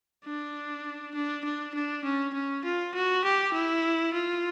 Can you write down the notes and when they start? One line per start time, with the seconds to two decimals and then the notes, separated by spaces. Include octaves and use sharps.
0.25 D4
1.15 D4
1.44 D4
1.74 D4
2.05 C#4
2.34 C#4
2.65 F4
2.95 F#4
3.24 G4
3.54 E4
4.14 F4